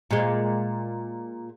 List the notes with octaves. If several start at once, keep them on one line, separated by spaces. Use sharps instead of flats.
A#2 G#3